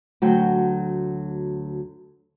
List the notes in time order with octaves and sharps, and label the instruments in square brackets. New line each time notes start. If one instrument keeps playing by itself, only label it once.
[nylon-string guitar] D2 F#3 F#4 G5